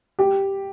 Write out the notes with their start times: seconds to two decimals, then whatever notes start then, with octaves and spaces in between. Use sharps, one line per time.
0.19 G4